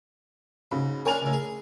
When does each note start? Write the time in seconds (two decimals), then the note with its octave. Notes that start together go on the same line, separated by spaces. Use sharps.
0.71 G#2 C#3 B5
1.05 D4 F4 A#4 C#5 G#5 F7
1.22 C#2 A2
1.33 G#4